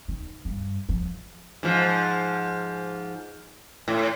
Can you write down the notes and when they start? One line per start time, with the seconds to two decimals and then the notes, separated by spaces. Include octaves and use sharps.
0.08 D#3
0.45 G2
0.89 F3
1.63 G#2 F3
3.88 A2